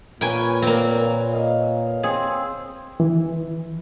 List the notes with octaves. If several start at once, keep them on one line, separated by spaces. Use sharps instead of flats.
A#2 A#4 B4 C#5 G5 G#5
A#3 C4
D#5 F5
C4 G#4
E3